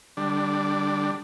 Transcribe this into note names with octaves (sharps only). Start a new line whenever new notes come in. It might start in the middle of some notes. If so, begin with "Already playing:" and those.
D3 G3 D4